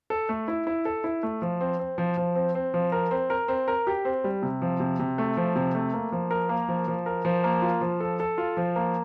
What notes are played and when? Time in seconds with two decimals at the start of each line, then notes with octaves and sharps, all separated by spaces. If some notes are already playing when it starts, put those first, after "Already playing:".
0.10 A4
0.29 A3
0.48 E4
0.67 E4
0.85 A4
1.04 E4
1.23 A3
1.42 F3
1.61 C4
1.79 C4
1.98 F3
2.17 F3
2.35 C4
2.55 C4
2.74 F3
2.92 A#4
3.11 C4
3.30 A#4
3.48 C4
3.68 A#4
3.87 G4
4.05 C4
4.24 G3
4.43 C3
4.62 F3
4.80 C3
4.99 C3
5.18 A3
5.37 F3
5.56 C3
5.75 A3
5.94 A#3
6.12 F3
6.31 A#4
6.49 A#3
6.68 F3
6.88 F3
7.06 A#4
7.25 F3
7.44 A#3
7.62 F4
7.81 F3
8.00 A4
8.20 A4
8.38 F4
8.57 F3
8.76 A#3